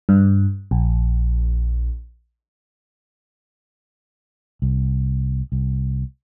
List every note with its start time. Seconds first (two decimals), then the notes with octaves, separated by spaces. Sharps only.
0.09 G2
0.71 A#1
4.62 C2
5.52 C2